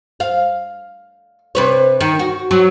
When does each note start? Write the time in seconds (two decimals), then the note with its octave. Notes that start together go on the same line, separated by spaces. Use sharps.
0.20 F5
1.55 C3 B4 C#5
2.01 D#3
2.19 F#4
2.51 F#3